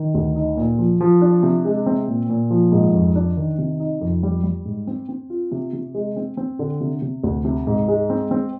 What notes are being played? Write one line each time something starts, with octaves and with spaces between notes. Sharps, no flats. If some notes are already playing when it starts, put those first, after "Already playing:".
Already playing: D#3
D2
D#4
A#2
F3
F3
D4
C3
G#3
C4
A#2
A#2
F3
G#2
F2
D4
D#3
C3
D#4
F2
G3
G3
G#2
C4
C4
F4
C3
C3
G#3
C4
C4
D3
C3
C3
D2
C3
G#2
G#3
C4
C4